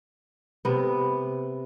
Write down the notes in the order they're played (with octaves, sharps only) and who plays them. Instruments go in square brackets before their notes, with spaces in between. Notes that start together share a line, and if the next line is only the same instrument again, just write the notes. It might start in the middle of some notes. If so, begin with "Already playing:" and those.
[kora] C3 B3